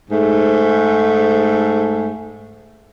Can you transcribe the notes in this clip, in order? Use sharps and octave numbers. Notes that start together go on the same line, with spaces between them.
G#2 A3